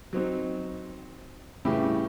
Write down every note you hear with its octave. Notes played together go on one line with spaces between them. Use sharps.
F#3 C4 D#4
A2 C#3 E3 G3 G4